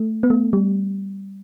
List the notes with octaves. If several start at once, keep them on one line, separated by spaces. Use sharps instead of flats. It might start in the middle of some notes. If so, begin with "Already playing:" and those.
Already playing: A3
B3
A3
G3